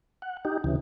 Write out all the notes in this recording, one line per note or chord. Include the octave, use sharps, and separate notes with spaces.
F#5
D#4 G4
D2 C#3 E3